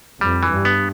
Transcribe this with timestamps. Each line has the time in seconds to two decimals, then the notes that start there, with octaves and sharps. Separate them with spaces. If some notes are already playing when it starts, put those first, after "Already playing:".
0.20 F2 G3
0.43 E3
0.50 G2
0.65 B3